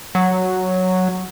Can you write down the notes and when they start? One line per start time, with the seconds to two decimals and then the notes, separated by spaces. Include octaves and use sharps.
0.15 F#3